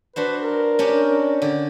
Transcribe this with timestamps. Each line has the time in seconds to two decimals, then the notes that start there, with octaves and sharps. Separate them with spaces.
0.16 D4 F#4 B4 C5
0.41 A#4
0.79 C#4 D4 G4
1.42 D3 G4